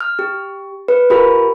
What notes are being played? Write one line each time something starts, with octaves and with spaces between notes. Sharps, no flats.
F6
G4
B4
F4 G4 A#4 B5